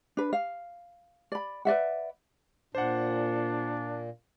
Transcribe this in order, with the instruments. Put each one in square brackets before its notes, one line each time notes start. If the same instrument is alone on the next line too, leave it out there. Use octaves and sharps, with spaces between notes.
[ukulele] D4 B4
F5
D5 B5
B4 D5 E5 F#5
[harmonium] A#2 [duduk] D4 [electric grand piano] C5 F#5